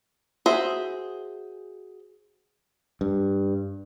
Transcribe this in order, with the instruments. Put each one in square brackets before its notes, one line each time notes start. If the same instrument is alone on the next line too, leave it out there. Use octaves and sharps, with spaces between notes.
[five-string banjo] F#4 G#4 C5 E5
[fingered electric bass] G2